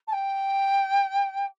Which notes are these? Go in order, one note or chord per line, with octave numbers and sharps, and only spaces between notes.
A5
G5